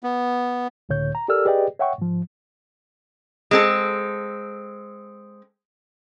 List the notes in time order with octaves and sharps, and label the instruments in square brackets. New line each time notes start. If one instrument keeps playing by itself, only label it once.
[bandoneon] B3
[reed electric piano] C#2 A2 D3 C#5 G6
A#5
G4 A4 A#4 D5 E6 F6
G4 G#4 B4 D5 D#5 G5
C#5 E5 F#5 G5 C#6
G#2 F3
[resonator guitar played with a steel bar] G#3 C4 A4